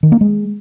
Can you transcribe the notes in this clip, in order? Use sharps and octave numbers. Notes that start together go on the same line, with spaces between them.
D#3
A#3
G#3